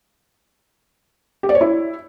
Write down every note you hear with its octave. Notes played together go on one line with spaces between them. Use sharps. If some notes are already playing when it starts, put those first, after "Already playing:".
G4
D5
C#5
E4